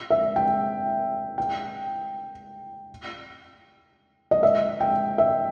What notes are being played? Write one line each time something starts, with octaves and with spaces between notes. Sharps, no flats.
E5
G5
G5
D#5
E5
G5
E5